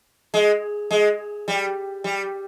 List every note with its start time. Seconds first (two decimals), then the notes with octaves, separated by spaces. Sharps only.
0.34 G#3
0.91 G#3
1.48 G3
2.04 G3